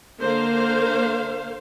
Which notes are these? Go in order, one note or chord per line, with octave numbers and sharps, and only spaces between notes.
D3 A#3 C5 F5